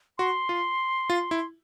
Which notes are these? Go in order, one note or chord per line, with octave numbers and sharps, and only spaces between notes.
F#4 C6
F4
F4
E4